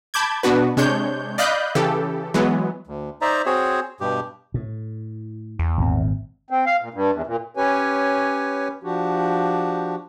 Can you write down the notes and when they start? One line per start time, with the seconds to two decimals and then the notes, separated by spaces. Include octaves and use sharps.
0.14 A5 B5 D6 G6 G#6
0.43 B2 B3 D4 F#4 B4
0.77 C3 G#3 D4 C#5 G6
1.38 D5 D#5 F5 B5 F#6 G6
1.75 C#3 E3 G4 A4
2.34 E3 F#3 G#3 B3
2.87 D2
3.21 D#4 C5 D5 E5 A#5
3.46 C4 F#4 G#4 C5 C#5
4.00 G2 B2 G4
4.54 A2
5.59 E2
5.78 G#1 A#2 C4
6.50 C4
6.66 F5
6.81 A#2
6.94 G2
7.13 E2
7.27 A#2
7.57 C#4 G4 B4 C#5 G#5
8.83 F3 D4 F#4 G4